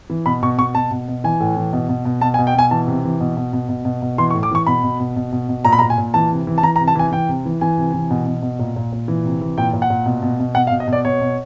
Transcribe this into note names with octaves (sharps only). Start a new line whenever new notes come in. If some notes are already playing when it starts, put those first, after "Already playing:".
E3
B2 B5
B2 C#6
B2 C#6
B2 A5
B2
B2
E3 G#5
A2
E3
B2
B2
B2
B2 A5
G#5
B2
G5
B2 G#5
E3 A5
C3
E3
B2
B2
B2
B2
B2
B2
E3 C6
C#6
A2
D6
E3 C#6
B2 B5
B2
B2
B2
B2
B2
A#2 A#5
B5
A#2 A#5
G#5
A#2
E3 A5
C3
E3
A5
E3 A#5
A#5
C3
A5
E3 G#5
E3 G5
C3
E3
E3 G#5
C3
E3
B2
B2
B2
A#2
A#2
A#2
E3
C3
E3
A#2 G5
A#2
F#5
A#2
B2
B2
B2
B2 F#5
F5
B2
D#5
B2
D5
B2 C#5
B2